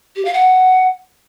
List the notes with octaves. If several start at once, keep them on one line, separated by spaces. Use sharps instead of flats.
G4
F5
F#5